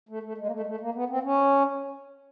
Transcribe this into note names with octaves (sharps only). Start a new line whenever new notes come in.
A3
A3
G#3
A#3
A3
G#3
A3
A#3
B3
C4
C#4